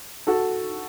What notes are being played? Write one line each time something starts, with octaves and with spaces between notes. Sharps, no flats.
F#4 A4